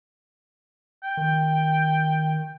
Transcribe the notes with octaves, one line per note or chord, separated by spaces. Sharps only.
G5
D#3